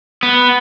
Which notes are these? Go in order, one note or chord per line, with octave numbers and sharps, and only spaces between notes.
B3